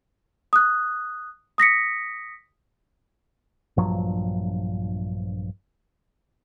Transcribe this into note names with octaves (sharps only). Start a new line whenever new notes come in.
D#6 F#6
D#6 A#6 B6 C#7
A#1 G2 F3 F#3